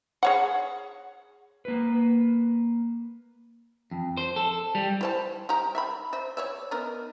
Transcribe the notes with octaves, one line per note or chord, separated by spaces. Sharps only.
G#4 C#5 F#5
A#3 B4
F2
C5
A4
G3
E4 C5 A5
D#4 G4 A#5
E5 F5 B5
C5 E5
C#5 D5 E5
B3 D#4 A#4